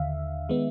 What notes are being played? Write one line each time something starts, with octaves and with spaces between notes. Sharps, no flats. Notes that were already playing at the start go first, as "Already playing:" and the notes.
Already playing: D#2 D3 E5 F5
D#3 G#3 B3